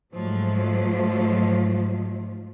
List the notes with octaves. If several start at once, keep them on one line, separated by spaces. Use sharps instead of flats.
G#2 F3 F#3 A3